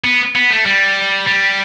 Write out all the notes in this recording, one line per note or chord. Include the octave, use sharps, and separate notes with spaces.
B3
B3
A3
G3
G3